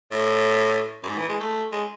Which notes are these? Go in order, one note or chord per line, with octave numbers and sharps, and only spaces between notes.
A2
F#2
G#2
E3
G#3
A3
G#3